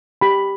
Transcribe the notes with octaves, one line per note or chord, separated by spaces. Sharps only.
G4 B5